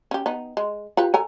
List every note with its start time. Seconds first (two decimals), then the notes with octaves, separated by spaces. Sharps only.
0.11 C#4 G4
0.26 B3 D#4
0.57 G#3
0.97 F4 G4 B4
1.14 A4 G#5 A#5